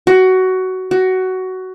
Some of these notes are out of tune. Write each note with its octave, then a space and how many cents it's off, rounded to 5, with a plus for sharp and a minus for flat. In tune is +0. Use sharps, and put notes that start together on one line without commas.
F#4 +15
F#4 +15